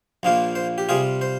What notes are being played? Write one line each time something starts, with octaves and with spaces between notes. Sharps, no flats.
A#1 A#2 F3 A#3 F4
C5
G4
C3 G3 C4 F4 G#4
C5